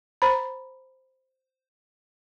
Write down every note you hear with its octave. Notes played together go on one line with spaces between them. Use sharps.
C5 A#5 B5